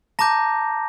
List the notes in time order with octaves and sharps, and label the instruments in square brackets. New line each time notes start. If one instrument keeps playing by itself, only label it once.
[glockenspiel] A5 A#5 D6 G6 A#6